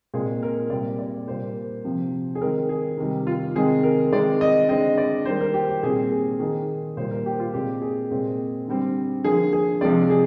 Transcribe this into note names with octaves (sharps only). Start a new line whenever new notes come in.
A#2 G#3 C4 G#4
A#4
A#2 G3 C4 D5
D5
A#2 G3 A#3 C5
C3 F3 C4
G#4
D#3 G#3 C4 A#4
G#4
C3 D#3 G3
F4
C3 D#3 G#3 C4 G#4
A#4
D#3 G#3 C4 D5
D#5
D3 G#3 C4 D#5
D5
D#3 G3 A#3 C5
A#4
G4
G4
A#2 G3 C4 G#4
G#4
D#3 A#3 G#4
A#2 G3 A#3 C5
A#4
G4
F4
A#2 G#3 C4 G4
G#4
A#2 G#3 C4
D3 G3 C4
D3 F3 A#3 G#4
G#4
C3 F3 G#3 C4 D5
G#4